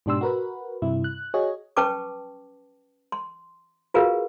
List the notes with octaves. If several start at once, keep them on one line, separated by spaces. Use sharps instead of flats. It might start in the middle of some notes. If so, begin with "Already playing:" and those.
G#2 B2 D4 G4 C6 E6
F#4 A#4 B4
G2 C3 E4
F#6
F#4 G#4 C#5 D#5
C#4 B4 G5 A5 C#6 D6
C6
F4 F#4 G#4 A#4 B4 F5